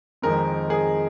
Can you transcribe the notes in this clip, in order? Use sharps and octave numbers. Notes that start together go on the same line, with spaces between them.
F2 D#3 G#3 C4 A#4
G#4